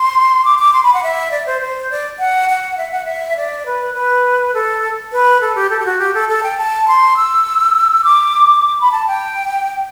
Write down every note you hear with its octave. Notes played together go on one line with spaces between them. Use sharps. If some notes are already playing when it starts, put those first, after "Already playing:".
Already playing: C6
D6
D6
C6
B5
F#5
E5
D5
C5
C5
D5
F#5
F#5
E5
F#5
E5
D5
B4
B4
A4
B4
A4
G4
A4
G4
F#4
G4
A4
A4
G5
A5
C6
E6
D6
B5
A5
G5